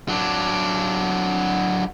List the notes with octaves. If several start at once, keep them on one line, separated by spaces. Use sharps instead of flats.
F#3 D4